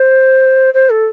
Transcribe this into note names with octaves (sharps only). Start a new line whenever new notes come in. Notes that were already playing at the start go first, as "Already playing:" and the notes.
Already playing: C5
C5
A4